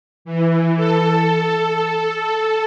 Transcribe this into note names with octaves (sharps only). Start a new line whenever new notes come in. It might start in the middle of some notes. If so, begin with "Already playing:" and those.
E3
A4